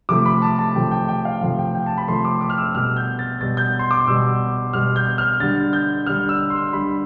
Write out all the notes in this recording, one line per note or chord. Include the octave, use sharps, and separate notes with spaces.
C3 F3 A3 D6
B5
A5
A5
C3 F3 A3 G5
G5
G5
F5
C3 F3 A3 F5
G5
G5
A5
B5
C3 F3 A3 C6
D6
D6
F6
E6
B2 G3 F6
G6
A6
B2 G3 A6
G6
C6
D6
B2 G3 E6
B2 G3 F6
G6
F6
D3 G3 A6
G6
D3 G3 F6
E6
C6
D3 G3 B5